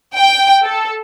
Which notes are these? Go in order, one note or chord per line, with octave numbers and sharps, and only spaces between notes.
G5
A4